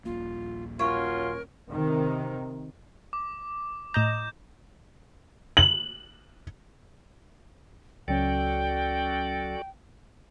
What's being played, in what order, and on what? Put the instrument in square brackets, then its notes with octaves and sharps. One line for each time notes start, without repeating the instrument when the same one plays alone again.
[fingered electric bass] D#1 A#1 A#3 [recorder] F4
[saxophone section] F#3 C#4 F4 [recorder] A#4 [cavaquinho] C#5
[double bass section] C3 D#3
[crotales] D6
[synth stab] A2 D#5 A#5 [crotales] G6 E7
[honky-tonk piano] F#7
[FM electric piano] C#2 F#3 C#4 [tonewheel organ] F#4 A4 D5 [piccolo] G5